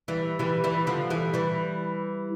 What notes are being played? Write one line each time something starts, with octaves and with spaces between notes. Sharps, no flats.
E3 G3
E3 G3
E3 G3
D3 F3
E3 G3
E3 G3